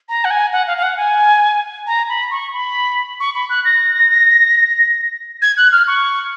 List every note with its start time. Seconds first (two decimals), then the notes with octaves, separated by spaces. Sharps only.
0.08 A#5
0.24 F#5
0.30 G#5
0.52 F#5
0.67 F5
0.77 F5
0.82 F#5
0.97 G#5
1.86 A#5
2.08 B5
2.31 C#6
2.53 B5
3.20 C#6
3.34 B5
3.49 F#6
3.64 A#6
5.41 G#6
5.57 F#6
5.71 F6
5.87 C#6